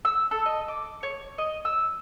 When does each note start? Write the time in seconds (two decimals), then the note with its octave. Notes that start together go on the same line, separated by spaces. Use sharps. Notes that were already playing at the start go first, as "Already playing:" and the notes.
0.05 E6
0.31 A4
0.46 D#5
0.68 D6
1.03 C#5
1.38 D#5
1.65 E6